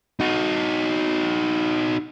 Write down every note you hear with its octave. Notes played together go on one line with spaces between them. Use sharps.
D#4 F#4